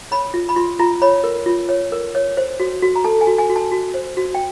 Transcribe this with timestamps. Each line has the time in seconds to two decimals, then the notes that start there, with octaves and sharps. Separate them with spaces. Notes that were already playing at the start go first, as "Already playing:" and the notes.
0.11 C#5 B5
0.34 F4
0.49 B5
0.56 F4 C6
0.79 F4 A#5
1.02 C#5 B5
1.24 A#4
1.46 F4
1.69 C#5
1.92 A#4
2.15 C#5
2.37 C5
2.60 F#4
2.83 F#4
2.96 A#5
3.04 A4 A5
3.21 G#5
3.27 F#4
3.38 G#5
3.50 F#4
3.56 A5
3.72 F#4
3.94 C5
4.17 F#4
4.35 G5